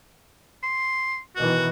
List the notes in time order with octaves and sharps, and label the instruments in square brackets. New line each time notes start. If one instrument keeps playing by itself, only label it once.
[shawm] C6
[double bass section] B2 D#3 E3 [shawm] F#4